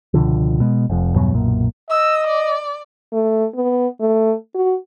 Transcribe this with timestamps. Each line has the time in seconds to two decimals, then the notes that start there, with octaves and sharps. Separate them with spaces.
0.14 C#2 B2 D3 F3
0.60 B2 G#3
0.90 F1 F2
1.15 E2 G2 B2 F#3
1.34 B1 F#2 A#2
1.89 D#5 E6
2.27 D5
3.13 A3
3.55 B3
4.00 A3
4.55 F#4